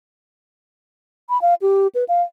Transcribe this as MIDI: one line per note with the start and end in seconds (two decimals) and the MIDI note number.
1.30 1.40 83
1.42 1.54 77
1.62 1.87 67
1.95 2.04 71
2.09 2.22 77